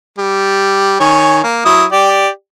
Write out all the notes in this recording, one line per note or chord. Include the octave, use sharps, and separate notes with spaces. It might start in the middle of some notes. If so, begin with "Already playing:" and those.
G3
D#3 C#5 G#5
A#3
F#3 E4 D#6
G4 D5